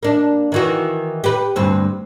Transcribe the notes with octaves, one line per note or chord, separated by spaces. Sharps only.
A#3 D4
D#3 E3 F#4
G4 B4
D2 G2 C4